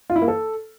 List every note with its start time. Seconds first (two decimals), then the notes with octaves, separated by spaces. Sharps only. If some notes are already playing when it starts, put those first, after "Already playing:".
0.10 F4
0.16 E4
0.22 A#3
0.28 A4